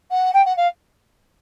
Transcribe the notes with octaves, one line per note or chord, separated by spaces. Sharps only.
F#5
G5
F#5
F5